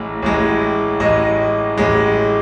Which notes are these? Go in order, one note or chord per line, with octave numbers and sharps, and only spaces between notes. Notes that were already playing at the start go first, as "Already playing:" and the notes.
Already playing: A1 A2 G#3
A1 A2 G#3
A1 A2 G#3 D#5
A1 A2 G#3